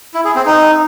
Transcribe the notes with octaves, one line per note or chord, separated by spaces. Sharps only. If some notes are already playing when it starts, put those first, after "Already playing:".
E4
G#4
C4
D#4